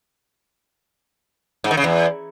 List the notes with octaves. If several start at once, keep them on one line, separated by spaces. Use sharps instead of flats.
G#2
D#3
C#3
E2